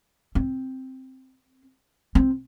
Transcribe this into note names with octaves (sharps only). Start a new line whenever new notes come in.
C4
C4